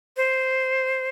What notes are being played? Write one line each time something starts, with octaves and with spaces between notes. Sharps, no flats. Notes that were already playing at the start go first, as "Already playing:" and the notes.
C5